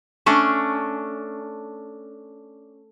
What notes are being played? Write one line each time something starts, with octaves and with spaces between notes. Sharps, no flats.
A3 C#4 D4